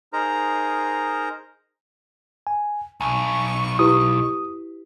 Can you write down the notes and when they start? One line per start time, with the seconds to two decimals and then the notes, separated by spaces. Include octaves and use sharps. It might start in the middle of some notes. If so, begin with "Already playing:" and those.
0.13 D#4 G#4 A#4 C5 A#5
2.47 G#5
3.01 B1 G#5 C#6
3.79 E4 G4 B4 D#6